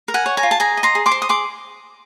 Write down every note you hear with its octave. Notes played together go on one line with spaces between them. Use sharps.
A#4
F#5 G#5
C#5
G#5 A#5
F4
A5
G#4 G#5 A#5
D#5
A#5 C6
G#4
C6 D6
C5
D#6
G#4 C6 D6